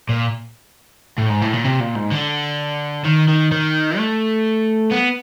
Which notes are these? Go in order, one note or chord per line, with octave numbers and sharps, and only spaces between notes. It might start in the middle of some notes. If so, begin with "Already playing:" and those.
A#2
A2
G#2
A2
A#2
C3
A#2
G#2
D3
D#3
D#3
D#3
A3
B3